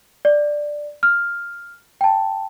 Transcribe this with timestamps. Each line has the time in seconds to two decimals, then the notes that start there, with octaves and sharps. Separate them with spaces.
0.25 D5
1.03 F6
2.01 G5 A5